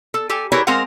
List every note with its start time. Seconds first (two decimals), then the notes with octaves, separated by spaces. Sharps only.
0.14 A4
0.29 G4 A4 G#5
0.52 E4 G4 G#4 A#4 B4 C#5
0.67 G#3 C4 A#4 F5 F#5